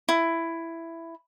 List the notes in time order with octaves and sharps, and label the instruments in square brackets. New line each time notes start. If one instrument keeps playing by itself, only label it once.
[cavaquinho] E4